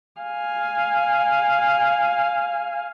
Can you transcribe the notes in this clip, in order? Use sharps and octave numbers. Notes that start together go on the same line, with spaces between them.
F5 G#5